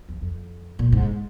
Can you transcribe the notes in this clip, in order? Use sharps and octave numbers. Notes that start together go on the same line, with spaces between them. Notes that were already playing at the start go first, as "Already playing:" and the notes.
E2
F2
A#2
G#2